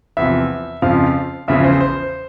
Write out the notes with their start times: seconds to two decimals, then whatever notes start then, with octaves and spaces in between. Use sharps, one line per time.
0.17 E2 C3 F3 E5
0.82 F2 C#3 F3 F5
1.48 E2 C#3 F3 E5
1.64 C5
1.81 C5